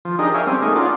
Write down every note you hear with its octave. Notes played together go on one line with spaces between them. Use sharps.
F3
D4 D#4 G4 G#4 A#4 D#5
A#4 C#5 E5 F5 G5 G#5
G3 C4 C#4
A3 A#3 D#4 G#4
C#4 D#4 F4 F#4 D5